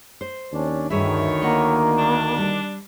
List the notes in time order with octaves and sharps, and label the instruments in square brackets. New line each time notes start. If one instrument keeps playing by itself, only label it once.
[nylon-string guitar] C5
[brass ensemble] D#2 C#4 D4
[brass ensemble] D2 D#3 [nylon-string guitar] G2 G#4 E5 [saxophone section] E4 C#5
[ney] A#3 [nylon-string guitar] D#5 F#5
[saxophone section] D4
[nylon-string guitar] G3